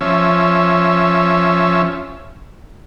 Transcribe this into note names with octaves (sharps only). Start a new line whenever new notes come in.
F3 C#4 E5